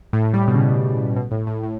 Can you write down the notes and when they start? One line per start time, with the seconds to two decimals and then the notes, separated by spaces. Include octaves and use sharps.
0.13 A2
0.34 G3
0.48 B2
0.54 C#3
1.16 B2
1.31 A2
1.47 A2
1.63 A2